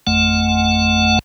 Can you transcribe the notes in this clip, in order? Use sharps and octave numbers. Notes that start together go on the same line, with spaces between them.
G#1 F2 A3 F#5